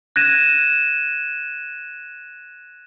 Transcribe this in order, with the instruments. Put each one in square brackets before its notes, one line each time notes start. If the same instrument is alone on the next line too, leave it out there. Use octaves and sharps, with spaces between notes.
[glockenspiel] F#6 G#6 A#6 D#7 E7